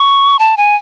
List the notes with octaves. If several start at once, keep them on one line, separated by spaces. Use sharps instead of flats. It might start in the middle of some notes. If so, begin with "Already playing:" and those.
Already playing: C#6
A5
G#5